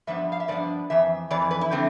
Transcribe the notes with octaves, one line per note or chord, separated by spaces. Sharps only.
G2 F3 B3 D4 E5
F5
E5
G2 F3 B3 D4 D5
F2 E3 E5
F2 E3 D5
B4
E4
D3 F3 A3 C4